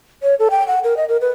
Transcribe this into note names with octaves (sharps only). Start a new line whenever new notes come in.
C#5
A4
G5
F#5
A#4
D#5
A#4
B4